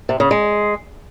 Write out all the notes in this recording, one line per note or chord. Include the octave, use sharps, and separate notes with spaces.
C3
C#3
G#3